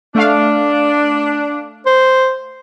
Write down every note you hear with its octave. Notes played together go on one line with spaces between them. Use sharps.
A3 D4 F5
C5